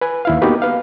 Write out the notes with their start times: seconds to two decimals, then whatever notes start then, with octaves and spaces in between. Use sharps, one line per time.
0.01 B4 G#5
0.25 D#2 E4 F5
0.42 A#3 B3 D#4 F#4 G4 B4
0.62 B4 F5